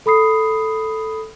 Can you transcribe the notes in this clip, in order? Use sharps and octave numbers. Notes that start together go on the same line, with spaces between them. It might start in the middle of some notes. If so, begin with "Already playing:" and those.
A4 B5 D#6 C7